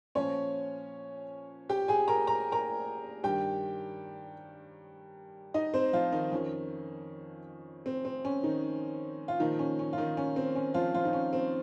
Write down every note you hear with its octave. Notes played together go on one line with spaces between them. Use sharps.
A#2 F3 C#4 C#5
G4 G5
G#4 G#5
A#4 A#5
A#5
A#4 A#5
G2 D#3 G4 G5
D#4 D#5
C4 C5
F3 F4
D#3 D#4
F2 D#3 C#4
C4
C4
C#4
D#3 D#4
F4
A#2 D#3 F3 D#4
C#4
C#4
F4
D#3 D#4
C#4
C4
C#4
F3 F4
F3 F4
D#4
C#4
C4